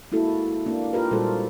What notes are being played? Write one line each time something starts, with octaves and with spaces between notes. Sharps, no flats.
G#3 A#3 E4 F#4 A4
A#3 D4
F4 G4 A#4 B4
A#2 G3 G#3 F#4 A4 C5